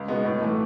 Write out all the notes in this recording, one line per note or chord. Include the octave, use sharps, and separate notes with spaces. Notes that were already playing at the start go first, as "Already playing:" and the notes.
Already playing: C#2
B2 G#3 B3
A2
E3 A3